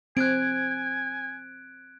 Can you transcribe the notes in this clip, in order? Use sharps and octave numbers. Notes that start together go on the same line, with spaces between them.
C4 G#5 F#6 G#6 D7